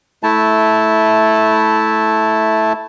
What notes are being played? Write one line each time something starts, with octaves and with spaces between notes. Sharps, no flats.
A3 E4 A5